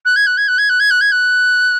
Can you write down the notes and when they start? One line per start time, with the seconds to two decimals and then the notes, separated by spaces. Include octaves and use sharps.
0.05 F#6
0.16 G#6
0.26 F#6
0.37 G#6
0.48 F#6
0.58 G#6
0.69 F#6
0.79 G#6
0.90 F#6
1.00 G#6
1.11 F#6